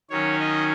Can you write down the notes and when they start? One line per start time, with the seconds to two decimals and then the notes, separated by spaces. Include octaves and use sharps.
0.10 D#3 F#3 C#4 C#5
0.40 D#5